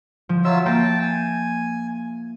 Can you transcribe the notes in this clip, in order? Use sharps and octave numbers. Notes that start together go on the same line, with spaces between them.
F3
F#3 F4 E5 E6
A#3 G5 A5
G#5